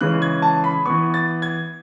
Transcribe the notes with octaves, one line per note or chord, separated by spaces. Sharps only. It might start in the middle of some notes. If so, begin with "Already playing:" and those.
C#3 E3 G#3 C#4 F#6
G#6
A5
B5
E3 B3 C#6
A6
G#6